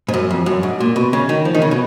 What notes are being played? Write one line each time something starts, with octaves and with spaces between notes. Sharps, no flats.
G#2
F#2
F2
F#2
G#2
A#2
B2
C#3
D#3
F3
D#3
C#3
B2